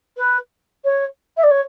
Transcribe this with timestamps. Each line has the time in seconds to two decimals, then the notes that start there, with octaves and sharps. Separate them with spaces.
0.17 B4
0.84 C#5
1.37 E5
1.43 D5
1.51 C#5